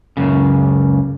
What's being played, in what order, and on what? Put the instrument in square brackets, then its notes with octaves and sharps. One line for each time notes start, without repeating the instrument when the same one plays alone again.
[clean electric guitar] C#2 F#2 C#3